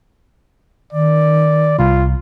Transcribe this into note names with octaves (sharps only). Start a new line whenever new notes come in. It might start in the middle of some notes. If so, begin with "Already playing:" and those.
D#3 D5
C2 F4